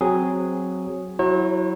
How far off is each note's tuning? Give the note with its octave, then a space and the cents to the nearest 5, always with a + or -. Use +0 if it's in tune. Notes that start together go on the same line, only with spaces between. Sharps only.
F#3 +0 C4 +0 G#4 +0
F#3 +0 E4 +0 C#5 -45